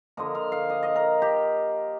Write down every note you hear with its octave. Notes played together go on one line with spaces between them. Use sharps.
D3 F3 A#3 D#5
F5
F5
D#5
D#5
A#4
G4